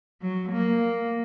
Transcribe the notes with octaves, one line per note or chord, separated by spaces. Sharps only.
F#3
A#3